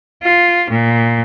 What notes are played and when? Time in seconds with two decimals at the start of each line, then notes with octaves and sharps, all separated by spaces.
0.23 F4
0.70 A#2